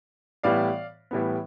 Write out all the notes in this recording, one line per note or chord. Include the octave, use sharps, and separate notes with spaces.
A2 E3 G3 B3 D5 F5
A2 E3 G3 B3